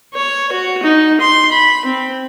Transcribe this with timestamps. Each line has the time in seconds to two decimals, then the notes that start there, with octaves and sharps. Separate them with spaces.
0.15 C#5
0.52 F#4
0.83 D#4
1.21 C6
1.51 B5
1.85 C4